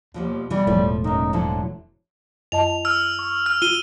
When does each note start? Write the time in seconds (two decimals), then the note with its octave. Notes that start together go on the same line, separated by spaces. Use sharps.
0.14 D#2 B2 F3 G3
0.50 B2 E3 G3
0.67 E1 A2 F3
1.04 F#2 A#2 D#4
1.33 D3 F3 F#3 E4
2.52 F#2 D#5 A5 F7
2.85 E6 F6
3.19 C#6
3.46 F6
3.62 F4 D#7 G7